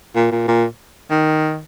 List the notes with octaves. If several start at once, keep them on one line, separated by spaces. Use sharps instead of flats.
A#2
A#2
A#2
D#3